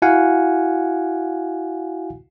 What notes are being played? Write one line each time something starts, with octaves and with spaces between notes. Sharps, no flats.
E4 F#4 F5 F#5 G#5